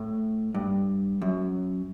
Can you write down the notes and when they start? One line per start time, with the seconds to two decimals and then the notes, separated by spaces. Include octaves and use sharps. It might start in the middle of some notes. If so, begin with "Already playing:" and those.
Already playing: A2
0.55 G2
1.22 F#2